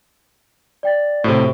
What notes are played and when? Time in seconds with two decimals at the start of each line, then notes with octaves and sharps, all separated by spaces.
0.83 D5 G5 A6
1.24 A2 C3 F#4 C5